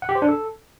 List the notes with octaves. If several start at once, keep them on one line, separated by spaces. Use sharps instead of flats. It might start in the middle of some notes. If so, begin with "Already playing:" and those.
F#5
G4
C5
D4
A4